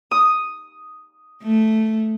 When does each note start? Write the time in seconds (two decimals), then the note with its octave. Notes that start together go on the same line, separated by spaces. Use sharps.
0.11 D#6
1.43 A3